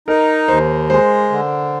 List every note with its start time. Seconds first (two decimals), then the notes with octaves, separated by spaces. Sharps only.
0.08 D#4 A#4
0.48 D#2 C5
0.90 G#3 C5
1.31 D3